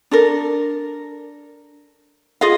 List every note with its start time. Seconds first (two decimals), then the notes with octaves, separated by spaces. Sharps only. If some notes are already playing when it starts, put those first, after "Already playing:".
0.11 D4 A4 A#4
2.41 F4 G#4 D#5 F5